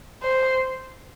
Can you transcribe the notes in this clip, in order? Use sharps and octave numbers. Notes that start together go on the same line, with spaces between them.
C5